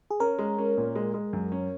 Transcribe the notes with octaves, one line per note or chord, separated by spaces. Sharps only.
G#4
C#4 A#4
G#3
C#4
A#2
G#3
G#3
F#2
C#4